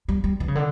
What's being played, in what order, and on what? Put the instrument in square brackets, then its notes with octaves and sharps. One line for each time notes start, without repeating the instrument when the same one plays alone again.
[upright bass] G3
G3
E3
C#3
D3